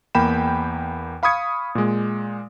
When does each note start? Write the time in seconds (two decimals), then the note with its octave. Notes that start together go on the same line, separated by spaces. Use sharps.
0.15 E2 A#3 G5 B5 E7
1.23 F5 B5 C#6 D#6 G#6 C#7
1.75 A#2 G#3